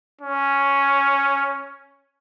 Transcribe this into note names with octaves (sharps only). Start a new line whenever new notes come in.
C#4